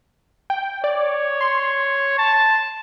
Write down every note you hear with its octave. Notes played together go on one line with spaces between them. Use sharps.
G5
C#5 D5
C6
A5